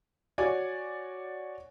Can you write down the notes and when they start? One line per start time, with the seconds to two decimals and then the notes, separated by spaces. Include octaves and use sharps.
0.38 F#4 C#5 D5 G#5